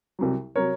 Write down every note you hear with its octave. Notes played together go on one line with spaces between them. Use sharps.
C2 C3 F#3
C3 F#3 A#4 C#5